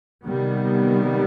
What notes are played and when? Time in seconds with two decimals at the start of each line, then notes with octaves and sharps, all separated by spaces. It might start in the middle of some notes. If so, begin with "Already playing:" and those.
0.24 C3 D#3 G3 B3